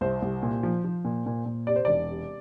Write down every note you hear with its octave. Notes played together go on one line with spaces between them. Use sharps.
C2 C5
C2
A#2
F3
F3
A#2
A#2
A#2
C3 D5
C5
E1 D5
C3